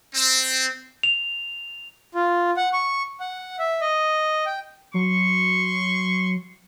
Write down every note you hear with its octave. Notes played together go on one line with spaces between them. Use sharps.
C4
F7
F4
F#5
C#6
F#5
E5
D#5
G5
F#3 C6 C#6